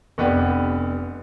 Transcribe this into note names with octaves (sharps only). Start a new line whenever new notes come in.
F1 B3 D4 G4